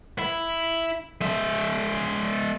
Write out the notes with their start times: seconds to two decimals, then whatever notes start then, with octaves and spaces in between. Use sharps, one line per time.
0.19 E4
1.21 G#3 E5